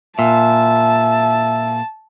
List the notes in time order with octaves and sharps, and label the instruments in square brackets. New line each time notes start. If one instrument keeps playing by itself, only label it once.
[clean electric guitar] A#2 [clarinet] E5 [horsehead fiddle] A5